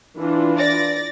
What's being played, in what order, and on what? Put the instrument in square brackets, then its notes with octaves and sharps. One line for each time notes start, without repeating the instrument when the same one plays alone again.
[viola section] E3 D4 F4
[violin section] D5 A6 A#6